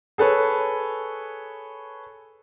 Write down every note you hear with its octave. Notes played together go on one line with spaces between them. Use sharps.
G#4 A4 B4 C#5